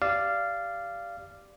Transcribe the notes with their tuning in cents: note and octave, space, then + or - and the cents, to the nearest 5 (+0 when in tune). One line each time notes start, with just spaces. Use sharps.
G4 +0 D5 +0 F5 -15